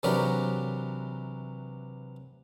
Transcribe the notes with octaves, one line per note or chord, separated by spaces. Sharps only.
C3 E3 F#3 D4 G4 A#4